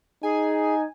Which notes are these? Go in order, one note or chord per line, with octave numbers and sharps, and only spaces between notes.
D#4 G#4 G#5